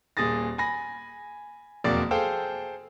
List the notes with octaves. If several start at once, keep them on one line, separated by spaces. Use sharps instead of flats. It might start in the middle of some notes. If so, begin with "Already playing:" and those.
D#1 A#2 G#4 D#6 A6 A#6
G#5 B5 A#6
E1 F2 F#3 A#3 D5 A6
G#4 A4 C5 F5 G5 E6